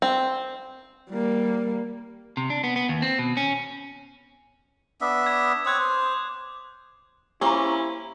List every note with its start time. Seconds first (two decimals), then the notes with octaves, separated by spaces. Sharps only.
0.02 C4
1.11 G3 A#3
2.37 C3
2.50 D4
2.64 B3
2.76 B3
2.89 D#2
3.02 C4
3.19 B2
3.37 C#4
5.01 B3 D4 E5
5.23 D6 G#6
5.66 C4 C#5 D#6 F#6 G#6
5.80 C5
6.05 D#6
7.41 A#3 C4 C#4 E4 G4 A#5